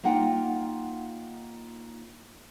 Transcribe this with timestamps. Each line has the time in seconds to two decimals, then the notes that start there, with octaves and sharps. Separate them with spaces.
0.03 A#3 D#4 F4 F#5 G5